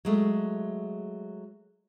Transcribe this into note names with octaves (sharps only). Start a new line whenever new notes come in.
F#3 G#3 A3